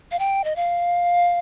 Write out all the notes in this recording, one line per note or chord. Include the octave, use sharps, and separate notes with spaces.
F5
G5
D#5
F5